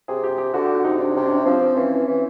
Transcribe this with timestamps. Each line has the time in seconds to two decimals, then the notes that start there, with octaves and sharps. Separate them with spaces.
0.08 C3 G#4
0.24 G4
0.38 G4
0.54 D3 F#4
0.64 G4
0.75 F#4
0.84 C3 D#4
0.99 D4
1.15 C3 C#4
1.23 D4
1.30 C#4
1.45 F3 C4
1.76 E3 C#4
2.07 E3